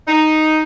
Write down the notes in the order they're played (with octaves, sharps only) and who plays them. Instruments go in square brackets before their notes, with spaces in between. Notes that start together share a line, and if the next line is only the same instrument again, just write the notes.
[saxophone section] D#4